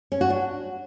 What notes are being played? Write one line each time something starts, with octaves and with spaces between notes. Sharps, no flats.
C#4
F#4
D4